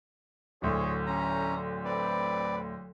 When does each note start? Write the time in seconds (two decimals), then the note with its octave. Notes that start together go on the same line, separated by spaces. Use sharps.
0.62 D1 D2 G#4 C5 C#5
1.06 C#4 A#5
1.85 C4 B4 D5